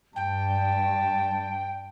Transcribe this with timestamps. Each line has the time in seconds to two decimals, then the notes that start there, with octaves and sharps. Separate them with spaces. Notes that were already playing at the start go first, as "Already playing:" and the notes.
0.16 G2 G5 A5